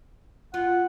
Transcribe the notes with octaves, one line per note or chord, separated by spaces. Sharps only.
F4 F#5